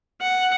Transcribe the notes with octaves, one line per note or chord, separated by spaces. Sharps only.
F#5